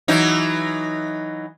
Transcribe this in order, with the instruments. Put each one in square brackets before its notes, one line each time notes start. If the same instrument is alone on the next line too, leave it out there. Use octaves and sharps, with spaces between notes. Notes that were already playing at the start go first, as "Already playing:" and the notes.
[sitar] E3 F#3 D#4